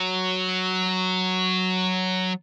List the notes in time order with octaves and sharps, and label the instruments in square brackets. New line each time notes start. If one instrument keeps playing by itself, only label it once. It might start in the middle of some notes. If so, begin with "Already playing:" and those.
Already playing: [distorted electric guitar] F#3